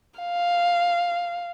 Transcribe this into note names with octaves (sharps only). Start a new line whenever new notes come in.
F5